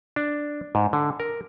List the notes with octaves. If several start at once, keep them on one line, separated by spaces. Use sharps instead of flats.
D4
G#2
D3
A#4